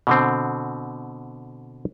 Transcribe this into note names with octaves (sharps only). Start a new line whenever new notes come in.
B2 D3 C4